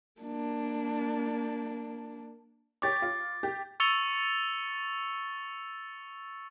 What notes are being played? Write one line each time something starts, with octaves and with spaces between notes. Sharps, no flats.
A#3 D4
G4 C#5 D6 A6
F4
G4
C#6 E6 A6 C#7 F7 G7